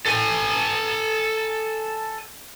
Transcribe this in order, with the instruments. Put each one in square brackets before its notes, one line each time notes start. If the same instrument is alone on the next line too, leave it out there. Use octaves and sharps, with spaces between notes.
[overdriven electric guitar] A4 G#5